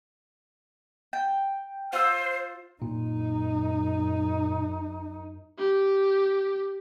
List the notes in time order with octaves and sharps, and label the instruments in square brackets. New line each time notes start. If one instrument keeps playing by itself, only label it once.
[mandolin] G5
[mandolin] F4 E6 [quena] C5
[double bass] F#2 D#4 [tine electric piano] A#2
[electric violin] G4